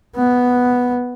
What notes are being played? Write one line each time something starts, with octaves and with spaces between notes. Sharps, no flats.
B3